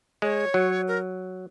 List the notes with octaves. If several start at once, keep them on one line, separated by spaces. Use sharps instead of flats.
G#3 C#5
F#3
A#4